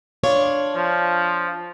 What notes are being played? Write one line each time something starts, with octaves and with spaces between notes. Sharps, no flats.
D4 F4 C#5
F3